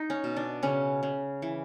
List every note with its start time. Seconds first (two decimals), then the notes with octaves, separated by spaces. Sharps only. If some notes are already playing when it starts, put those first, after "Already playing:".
Already playing: D#4
0.10 C#4
0.24 B2
0.37 D4
0.63 C#3 C#4
1.03 C#3
1.42 E3